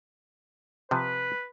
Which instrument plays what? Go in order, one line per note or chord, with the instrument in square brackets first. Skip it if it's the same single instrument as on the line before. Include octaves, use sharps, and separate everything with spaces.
[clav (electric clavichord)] C3 F3 [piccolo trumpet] B4